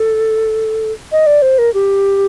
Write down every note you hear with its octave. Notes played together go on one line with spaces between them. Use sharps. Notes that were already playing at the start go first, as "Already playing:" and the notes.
Already playing: A4
D#5
D5
C5
A#4
G4